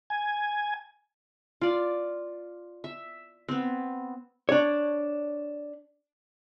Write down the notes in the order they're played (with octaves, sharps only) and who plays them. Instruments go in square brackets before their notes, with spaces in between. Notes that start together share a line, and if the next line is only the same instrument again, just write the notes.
[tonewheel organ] G#5
[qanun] F4 D5
E5
B3 C4
[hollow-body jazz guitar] D4 C#5